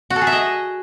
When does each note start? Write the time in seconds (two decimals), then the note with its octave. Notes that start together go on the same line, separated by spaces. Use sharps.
0.10 F#4
0.16 A4
0.21 G#4
0.27 E5
0.32 D#5